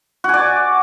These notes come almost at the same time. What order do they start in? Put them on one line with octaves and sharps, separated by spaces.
F#4 G#5 D5